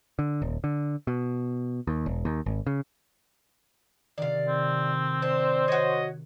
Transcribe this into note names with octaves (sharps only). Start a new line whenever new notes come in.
D3
D#1
D3
B2
D#2
E1
D#2
G#1
C#3
C3 D#3 D5 F5
C4
D4 C5
F#4 C#5 D#5